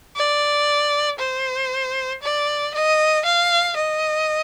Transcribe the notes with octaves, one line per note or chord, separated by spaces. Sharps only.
D5
C5
D5
D#5
F5
D#5